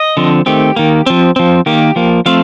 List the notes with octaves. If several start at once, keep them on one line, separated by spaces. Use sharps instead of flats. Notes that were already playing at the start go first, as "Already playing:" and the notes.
Already playing: D#5
D3 F3 C4
D#3 A3 C4 G4
D#3 A#3
F3 C4
F3 C4
D#3 A#3 G4
F3 A#3
F3 A3 C4 F5